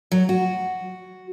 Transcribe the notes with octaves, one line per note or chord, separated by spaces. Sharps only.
F#3
F#4